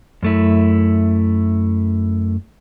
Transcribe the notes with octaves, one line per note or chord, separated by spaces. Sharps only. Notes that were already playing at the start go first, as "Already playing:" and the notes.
F#2 A3 E4